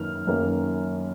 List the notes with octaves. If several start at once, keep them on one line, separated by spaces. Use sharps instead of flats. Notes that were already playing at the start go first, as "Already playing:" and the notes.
Already playing: F#2 D#3 A#3 F6
F#2 D#3 A#3